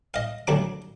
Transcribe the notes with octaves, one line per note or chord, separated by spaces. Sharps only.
D#5 F5
D2 F#3 D4 D6